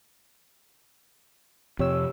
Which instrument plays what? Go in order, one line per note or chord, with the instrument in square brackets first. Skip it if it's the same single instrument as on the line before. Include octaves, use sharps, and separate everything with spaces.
[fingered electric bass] F2 C3 [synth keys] G4 C#5 E6